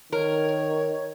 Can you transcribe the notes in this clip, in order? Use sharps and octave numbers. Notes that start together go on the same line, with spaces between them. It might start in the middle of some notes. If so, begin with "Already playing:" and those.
D#3 A#4 C#5